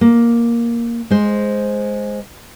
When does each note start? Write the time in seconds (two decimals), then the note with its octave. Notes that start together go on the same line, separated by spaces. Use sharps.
0.01 A#3
1.10 G#3 C5